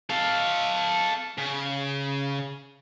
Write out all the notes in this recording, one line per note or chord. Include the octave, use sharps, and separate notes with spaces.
A4 F5
C#3